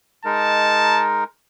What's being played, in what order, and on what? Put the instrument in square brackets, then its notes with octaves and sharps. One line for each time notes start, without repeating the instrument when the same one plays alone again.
[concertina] G#3 D#4 A#4 [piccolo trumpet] A5